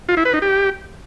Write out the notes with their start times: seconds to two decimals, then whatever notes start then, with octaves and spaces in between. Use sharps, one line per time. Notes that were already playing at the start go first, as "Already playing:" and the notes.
0.09 F4
0.17 E4
0.25 B4
0.34 D#4
0.42 G4